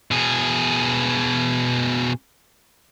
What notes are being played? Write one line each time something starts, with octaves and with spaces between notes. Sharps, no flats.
B2 G#4